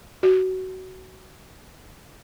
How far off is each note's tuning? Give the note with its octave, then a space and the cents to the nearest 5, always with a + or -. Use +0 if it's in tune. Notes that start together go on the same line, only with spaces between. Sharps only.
F#4 +20